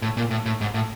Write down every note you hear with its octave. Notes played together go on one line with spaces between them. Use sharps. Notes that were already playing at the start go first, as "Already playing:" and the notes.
A2
A#2
A2
A2
G#2
A2